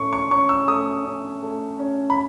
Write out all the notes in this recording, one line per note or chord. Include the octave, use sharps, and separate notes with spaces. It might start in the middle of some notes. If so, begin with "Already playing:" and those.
Already playing: A2 A3 C#4 C#6
C#6
C#4 C#6
E6
A3 D#6
C#4
A3
C#4
B5